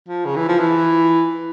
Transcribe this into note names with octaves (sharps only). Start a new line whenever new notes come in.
F3
C#3
E3
F3
E3